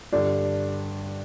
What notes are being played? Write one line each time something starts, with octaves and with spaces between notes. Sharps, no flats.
G2 D3 G3 D4